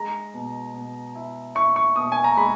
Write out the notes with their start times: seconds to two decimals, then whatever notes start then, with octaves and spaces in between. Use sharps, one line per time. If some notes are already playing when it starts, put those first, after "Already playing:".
Already playing: G#3 A#5
0.34 B2
0.74 B2
1.15 E4
1.55 E4 C#6
1.76 C#6
1.96 B2 D#6
2.12 G#5
2.24 A#5
2.37 G#3 B5